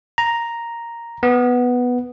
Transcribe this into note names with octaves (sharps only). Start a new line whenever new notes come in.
A#5
B3